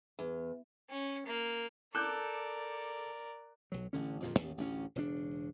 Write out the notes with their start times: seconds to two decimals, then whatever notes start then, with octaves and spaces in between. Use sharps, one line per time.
0.19 E2
0.90 C#4
1.26 A#3
1.95 A4 A#4 D5 D6 F#6 G6
3.72 B1 F#3
3.93 A1 D3 C#4
4.22 D1 F2 A#2 F3
4.37 A1 D#2
4.58 A1 D2 B3 C#4
4.95 E1 C#3 C#4 D4